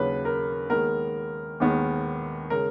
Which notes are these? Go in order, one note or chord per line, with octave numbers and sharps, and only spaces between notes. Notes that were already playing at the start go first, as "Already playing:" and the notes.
Already playing: D#2 C#3 F#3 C#4 B4
A#4
D#2 D#3 G#3 B3 A#4
D#2 D#3 G#3 B3
C#3 G#3 A#4